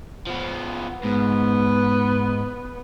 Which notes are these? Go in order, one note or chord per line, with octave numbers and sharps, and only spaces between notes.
F3 B3
G#2 B3